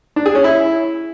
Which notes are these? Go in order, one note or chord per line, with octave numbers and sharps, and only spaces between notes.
D4
G#4
C#4
E4